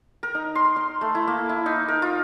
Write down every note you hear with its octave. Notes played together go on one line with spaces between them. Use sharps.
A#4
D#4
C6
C6
A3
E4
A#3
E4
D#4
A#4
F4